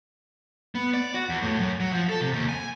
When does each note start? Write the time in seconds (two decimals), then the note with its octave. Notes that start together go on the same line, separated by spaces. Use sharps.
0.75 B3
0.94 D5
1.14 F#4
1.29 E2
1.42 A2
1.59 F#2
1.80 F#3
1.93 F3
2.09 A4
2.21 C3
2.33 D#2
2.49 G#5